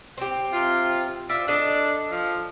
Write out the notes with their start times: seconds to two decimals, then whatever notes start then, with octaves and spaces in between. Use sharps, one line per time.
0.18 C4 G4
0.53 C3 F4
1.29 F4 C5 D5 E5
1.48 D4 A4 D#5
2.11 F3